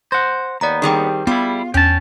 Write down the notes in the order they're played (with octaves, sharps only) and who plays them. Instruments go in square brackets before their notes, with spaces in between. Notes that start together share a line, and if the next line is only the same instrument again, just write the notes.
[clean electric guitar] C5 F#5 [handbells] A#6
[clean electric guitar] D#2 B3 [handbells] D5 A#5
[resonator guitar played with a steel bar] D#3 G3 C4 [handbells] G4 G#4 G5
[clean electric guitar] G3 E4 [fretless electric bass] B3 [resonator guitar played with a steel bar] F4
[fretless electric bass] E2 [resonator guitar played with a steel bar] C#4 [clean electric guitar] G5 A5